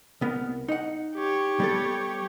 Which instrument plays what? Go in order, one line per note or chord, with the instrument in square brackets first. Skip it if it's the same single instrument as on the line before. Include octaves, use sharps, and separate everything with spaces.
[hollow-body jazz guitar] C2 B3 A#4
D#4 F#5
[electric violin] G4 C#5
[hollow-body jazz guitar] G3 B3 A4